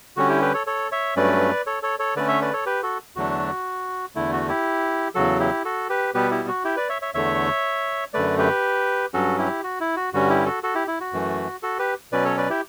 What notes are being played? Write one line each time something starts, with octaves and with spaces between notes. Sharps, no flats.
D3 G3 C#4 F#4
E4 G4
G4 B4
A4 C#5
A4 C#5
C#5 E5
G2 F#3 A3 C#4 B4 D5
A4 C#5
A4 C#5
A4 C#5
D3 A3 C#4 B4 D5
C#5 E5
B4 D5
A4 C#5
G4 B4
F#4 A4
E2 D3 F#3 A3 D4 F#4
E2 D3 A3 E4
F#4
E4 G4
E2 C#3 F#3 F#4 A4
E4 G4
F#4 A4
G4 B4
B2 G3 B3 G4 B4
E4 G4
F#4
E4 G4
B4 D5
C#5 E5
C#5 E5
E2 D3 A3 C#5 E5
F#2 D3 A3 B4 D5
G4 B4
G2 F#3 C#4 F#4 A4
E4 G4
F#4
E4
F#4
G2 D3 G3 C#4 F#4
E4 G4
F#4 A4
F#4 A4
E4 G4
E4
F#4
F#2 E3 A3
F#4 A4
G4 B4
B2 F#3 C#4 B4 D5
A4 C#5
B4 D5
E4 G4